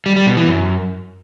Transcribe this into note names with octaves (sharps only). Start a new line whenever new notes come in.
G3
G3
B2
E3
F#2